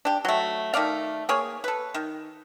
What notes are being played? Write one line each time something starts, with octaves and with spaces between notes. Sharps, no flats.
D4 G4
F#3 A3
D#3 A3 D5 F5
A#3 G#4 C#5
A4 B4
D#3